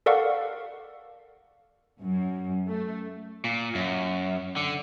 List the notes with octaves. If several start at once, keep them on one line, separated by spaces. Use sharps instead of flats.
A4 A#4 D5 F5 F#5 C#6
F#2
A3
A#2
F#2
D3